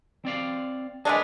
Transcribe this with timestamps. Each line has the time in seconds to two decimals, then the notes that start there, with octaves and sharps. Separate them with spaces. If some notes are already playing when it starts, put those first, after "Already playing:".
0.25 C4 D5 F5
1.05 G#3 A3 D4 G#4 A#4 B4